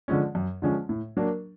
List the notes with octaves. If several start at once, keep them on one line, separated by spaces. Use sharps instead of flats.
D3 F3 G#3 C#4
F#2
D3 F3 G#3 C#4
A2
F#3 A#3 D4